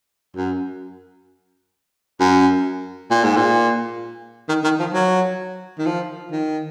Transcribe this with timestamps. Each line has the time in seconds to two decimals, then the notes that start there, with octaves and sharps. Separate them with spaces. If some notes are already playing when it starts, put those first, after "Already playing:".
0.37 F#2
2.20 F#2
3.11 A#2
3.24 G#2
3.37 A#2
4.49 D#3
4.64 D#3
4.80 F3
4.94 F#3
5.79 D#3
5.86 F3
6.32 D#3